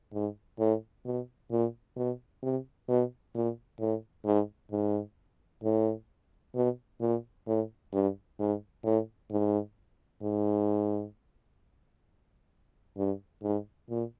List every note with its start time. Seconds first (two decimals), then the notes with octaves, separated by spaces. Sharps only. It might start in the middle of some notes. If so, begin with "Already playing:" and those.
0.13 G#2
0.59 A2
1.05 B2
1.51 A#2
1.96 B2
2.42 C3
2.88 B2
3.35 A#2
3.80 A2
4.26 G#2
4.72 G#2
5.64 A2
6.55 B2
7.01 A#2
7.47 A2
7.93 G2
8.39 G#2
8.84 A2
9.31 G#2
10.22 G#2
12.97 G2
13.42 G#2
13.89 A#2